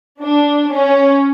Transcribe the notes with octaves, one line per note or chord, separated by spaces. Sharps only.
D4
C#4